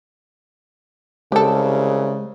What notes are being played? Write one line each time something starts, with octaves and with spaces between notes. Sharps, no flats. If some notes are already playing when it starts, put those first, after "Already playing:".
C2 C#3 G#3 G4 A4